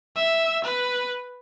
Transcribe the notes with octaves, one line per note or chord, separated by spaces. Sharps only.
E5
B4